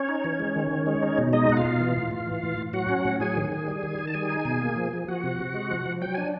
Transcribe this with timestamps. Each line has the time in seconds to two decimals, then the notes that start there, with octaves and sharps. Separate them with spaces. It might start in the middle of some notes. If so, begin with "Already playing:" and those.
Already playing: C#4 C#5
0.09 D#4
0.24 E3
0.40 G#3
0.56 D#3
0.71 D#3
0.87 G#3
1.02 D#4
1.18 B2
1.33 G#3 D#4 D#5
1.50 B2 F#5
1.57 F4 F5
1.65 B2
1.80 E3
1.97 A2
2.11 A2
2.27 E3
2.43 A2
2.58 A2
2.73 F#3 F#4 F#5
2.89 C#4
3.05 A2
3.20 F#3 G#4 G#5
3.36 D#3
3.52 D#3
3.68 G3
3.83 D#3
3.99 D#3
4.07 A5
4.14 G3 G#4 G#5
4.29 D#4
4.45 B2
4.61 A#3
4.76 F3
4.93 F3
5.08 F3 F#4 F#5
5.24 C3
5.39 C3
5.54 G#3
5.70 F3
5.86 F3
6.02 F#3 G5
6.14 D4 G#5